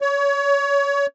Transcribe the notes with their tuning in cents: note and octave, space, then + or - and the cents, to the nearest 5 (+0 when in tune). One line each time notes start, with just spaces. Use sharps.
C#5 +25